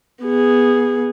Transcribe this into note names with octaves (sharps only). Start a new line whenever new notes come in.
B3 G#4